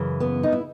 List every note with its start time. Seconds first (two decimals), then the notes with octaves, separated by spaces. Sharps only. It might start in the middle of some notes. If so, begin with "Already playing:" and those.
Already playing: F#2 C#3 E3
0.20 B3
0.43 D#4
0.52 E4